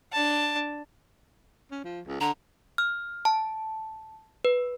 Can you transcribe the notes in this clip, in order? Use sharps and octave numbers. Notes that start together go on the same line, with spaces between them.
D4 A5
C#4
F3
C#2
D3 A#5
F6
A5
B4